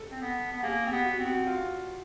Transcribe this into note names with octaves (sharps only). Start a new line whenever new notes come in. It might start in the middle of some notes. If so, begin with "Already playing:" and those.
Already playing: A4
C4
B3
B3
A#3 G#4
C4 G4
B3
F#4
C4
F#4
F4